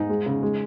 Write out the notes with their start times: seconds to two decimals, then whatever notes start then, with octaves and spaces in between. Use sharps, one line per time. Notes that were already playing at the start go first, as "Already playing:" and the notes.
Already playing: G#2 D#4
0.09 G#3
0.26 C#3
0.42 G#3